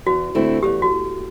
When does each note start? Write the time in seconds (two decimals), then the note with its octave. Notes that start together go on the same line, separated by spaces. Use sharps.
0.06 E2 F#4
0.35 D3 A3 C4 E4
0.63 E2 G4
0.82 F#4